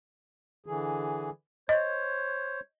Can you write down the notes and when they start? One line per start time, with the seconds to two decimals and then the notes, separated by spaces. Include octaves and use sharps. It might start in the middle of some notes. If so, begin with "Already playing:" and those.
0.66 D3 E3 G#4
1.69 C5 C#5 D#5